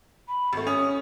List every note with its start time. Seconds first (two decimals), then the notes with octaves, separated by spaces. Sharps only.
0.28 B5
0.53 G#1 A3
0.67 C#4 D#6